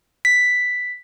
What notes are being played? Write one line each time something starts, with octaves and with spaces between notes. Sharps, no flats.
B6